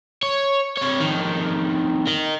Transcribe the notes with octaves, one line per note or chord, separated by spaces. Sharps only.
C#5
C3 C#5
F2 D#3
A#4 D#5